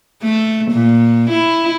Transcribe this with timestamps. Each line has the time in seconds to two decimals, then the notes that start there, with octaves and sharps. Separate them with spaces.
0.22 A3
0.72 A#2
1.31 E4